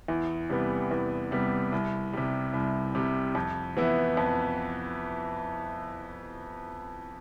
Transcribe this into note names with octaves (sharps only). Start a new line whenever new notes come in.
E2
C3 G3 B3
E2
C3 G3 B3
C2
C3 G3
C2
C3 G3
F2
E3 B3 E4
F2